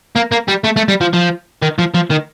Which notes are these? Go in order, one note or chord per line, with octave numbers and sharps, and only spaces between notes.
A#3
A#3
G3
A3
A3
G3
F3
F3
D#3
F3
F3
D#3